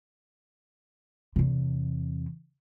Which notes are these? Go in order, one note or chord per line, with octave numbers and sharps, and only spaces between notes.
E2 C3